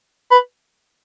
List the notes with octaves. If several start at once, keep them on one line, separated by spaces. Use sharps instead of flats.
B4